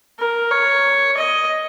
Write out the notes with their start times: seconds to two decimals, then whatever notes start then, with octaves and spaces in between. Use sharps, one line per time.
0.19 A#4
0.51 C#5
1.17 D#5